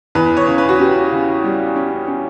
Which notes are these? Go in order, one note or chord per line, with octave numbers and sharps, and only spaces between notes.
E2 B4
C#5
C#3
B4
F#4
C#4 G4
C#3
G3
C#4
C#4